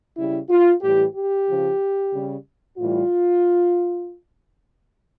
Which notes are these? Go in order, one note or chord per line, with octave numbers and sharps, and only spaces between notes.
C#3 G3 E4
F4
A2 E3 G3 G4
G4
C#3 F3
C#3 G3
A2 E3 G3 F4